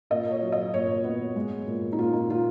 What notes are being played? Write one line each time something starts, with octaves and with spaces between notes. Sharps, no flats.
A#2 D#5
C#5
F#3
D#5
A#2 C#5
B3
G#3
A#2
D#4
A#2 F4
D#4
A#2 F4